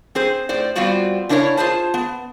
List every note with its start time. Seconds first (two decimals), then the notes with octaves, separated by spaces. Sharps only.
0.15 C4 G#4 C5
0.49 A2 C5 D5
0.76 G3 B3 C4 F4 F#4 D5
1.29 C#3 D4 E4 A#4 C#5
1.57 F4 G#4 C5 A5
1.94 B3